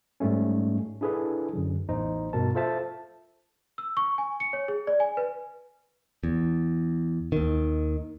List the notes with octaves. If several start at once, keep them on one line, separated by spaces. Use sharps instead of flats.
G#2 G3 A3 C#4
D4 E4 G#4 A4 B4
F#2 D3 F#3
A1 E2 D#4 C5
G2 B2 A#4 A5
F4 A4 C5 E5 A5
E6
C#6
G#5
C#7
C#5
G#4
D5
G#5
B4
E2
D#2 D#3